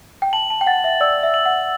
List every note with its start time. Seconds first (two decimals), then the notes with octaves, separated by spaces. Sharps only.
0.22 G5
0.33 A5 F#7
0.50 A5
0.61 G5
0.67 F#5 A6
0.84 E5
1.00 D5 E6
1.23 E5
1.34 F#7
1.45 F#5